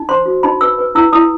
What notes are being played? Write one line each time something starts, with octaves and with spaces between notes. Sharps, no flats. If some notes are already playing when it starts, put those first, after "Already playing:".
Already playing: D#4
C5 C6
F#4
D#4 B5
B4 E6
B4
E4 E6
E4 D#6